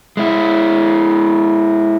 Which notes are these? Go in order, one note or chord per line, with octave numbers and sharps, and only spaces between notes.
G#3 E4